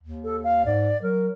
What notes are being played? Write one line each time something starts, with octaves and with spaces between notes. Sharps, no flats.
D#2
A4
F5
G#2 D5
F#3 A#4